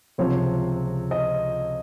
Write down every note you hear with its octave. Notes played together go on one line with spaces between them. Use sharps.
C#2 C3 F3 C4 C#5
D#5